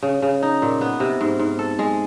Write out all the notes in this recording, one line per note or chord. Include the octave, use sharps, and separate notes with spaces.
C#3
C#3
D#4
A#2
B3
C3
G#2
G#2
A4
G#3